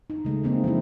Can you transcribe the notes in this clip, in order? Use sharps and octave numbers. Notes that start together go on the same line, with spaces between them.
D#4
C#3 G#3 A3
A3 A#3 C4 D4 D#4
F3 G#3 A#3 E4